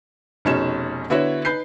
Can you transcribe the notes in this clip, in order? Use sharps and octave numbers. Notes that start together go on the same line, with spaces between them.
F1 B2 C#4 D#4 G#4 E7
D3 B3 E4 F#4 C#5
D#4 B4 G6 C7